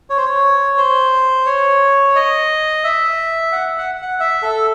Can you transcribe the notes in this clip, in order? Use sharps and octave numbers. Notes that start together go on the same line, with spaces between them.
C#5
C5
C#5
C5
C#5
D#5
E5
F#5
F#5
F#5
E5
A4